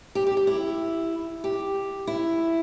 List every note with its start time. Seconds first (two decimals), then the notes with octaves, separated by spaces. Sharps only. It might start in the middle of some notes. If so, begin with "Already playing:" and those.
0.15 G4
0.27 G4
0.37 G4
0.47 E4
1.44 G4
2.07 E4